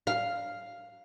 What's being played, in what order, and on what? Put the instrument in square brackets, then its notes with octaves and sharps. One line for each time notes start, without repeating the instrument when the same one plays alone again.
[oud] F5